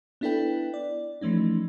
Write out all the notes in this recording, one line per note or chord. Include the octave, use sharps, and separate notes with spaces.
B3 D4 E4 A4 B4 G5
D5
E3 F3 A3 C#4 D#4